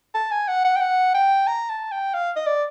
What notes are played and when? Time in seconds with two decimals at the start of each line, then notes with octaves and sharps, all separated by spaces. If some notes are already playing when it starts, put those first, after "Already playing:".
0.14 A5
0.31 G#5
0.48 F#5
0.65 F#5
0.76 G5
0.81 F#5
1.14 G5
1.47 A#5
1.69 A5
1.91 G5
2.14 F5
2.36 D#5
2.46 D5